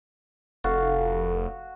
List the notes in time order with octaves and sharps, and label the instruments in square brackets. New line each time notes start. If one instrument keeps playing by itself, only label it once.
[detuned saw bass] F1 [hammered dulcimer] F#4 F5 [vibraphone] A4